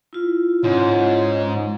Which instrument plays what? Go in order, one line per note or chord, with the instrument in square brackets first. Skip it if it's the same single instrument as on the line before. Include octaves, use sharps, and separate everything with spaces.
[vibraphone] E4 F4
[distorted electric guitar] G#2 [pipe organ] C#4